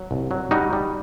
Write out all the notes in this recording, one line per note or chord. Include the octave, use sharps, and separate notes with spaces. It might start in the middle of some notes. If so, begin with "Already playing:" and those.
Already playing: F#3
C2
F#3
G3 D#4 F#4
G3